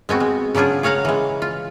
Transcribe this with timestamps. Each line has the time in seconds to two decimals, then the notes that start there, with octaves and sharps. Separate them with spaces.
0.09 G#3 B3 C4 F#4
0.20 G#3
0.55 C#3 F#3 D4 F4 G#4
0.83 G#4 C#5 F5 F#5 A#5
1.05 E3 G#3
1.42 F4